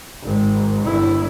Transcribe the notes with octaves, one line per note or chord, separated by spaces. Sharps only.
G#1
G1 E4